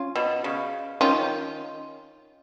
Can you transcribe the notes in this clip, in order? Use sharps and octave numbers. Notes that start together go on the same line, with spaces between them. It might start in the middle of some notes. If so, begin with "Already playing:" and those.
Already playing: C#4 F4
B2
C#3
D#3 C#4 F4